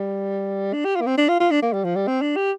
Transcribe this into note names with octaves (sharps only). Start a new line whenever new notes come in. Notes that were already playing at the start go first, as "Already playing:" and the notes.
Already playing: G3
D4
G4
F4
A#3
C4
D4
F4
F4
D4
A#3
G3
F3
G3
C4
D4
G4